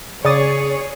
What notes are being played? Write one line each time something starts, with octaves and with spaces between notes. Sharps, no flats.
C#3 G#4 C#5 D5 D#6 A6